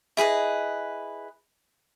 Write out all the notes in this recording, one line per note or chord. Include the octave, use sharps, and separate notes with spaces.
E4 G#4 B4 D#5